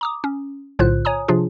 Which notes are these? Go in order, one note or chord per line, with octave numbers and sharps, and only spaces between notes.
A#5 D6 D#6
C#4
B1 A2 D3 F4 C5 F#6
C#5 G#5 A#5 D#6
C3 F3 D4 F4 G#4